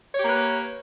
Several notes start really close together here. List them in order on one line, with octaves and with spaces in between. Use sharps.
C#5 G4 A#3 B4